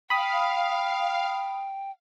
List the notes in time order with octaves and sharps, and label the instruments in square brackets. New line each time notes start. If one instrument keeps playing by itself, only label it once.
[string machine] F5 [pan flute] G5 [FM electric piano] B5 D#6